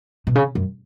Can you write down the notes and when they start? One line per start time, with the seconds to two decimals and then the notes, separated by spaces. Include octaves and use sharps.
0.27 B2
0.35 C#3
0.55 F#2